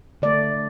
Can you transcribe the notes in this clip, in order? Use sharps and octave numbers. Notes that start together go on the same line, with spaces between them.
D3 A3 D5